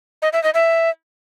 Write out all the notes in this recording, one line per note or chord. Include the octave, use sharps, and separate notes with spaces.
D#5
E5
D#5
E5